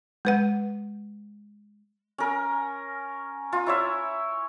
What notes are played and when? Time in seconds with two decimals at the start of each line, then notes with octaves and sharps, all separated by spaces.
0.25 G#3 B4 F#5
2.18 C#4 A#4
3.52 F4
3.66 E4 C#5 E5